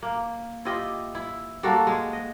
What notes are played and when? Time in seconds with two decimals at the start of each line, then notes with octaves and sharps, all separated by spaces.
0.02 A#3
0.65 E4 F4 G4 D#5
1.15 E4
1.63 G3 A#3 F#4 A4
1.87 G#3
2.13 D#5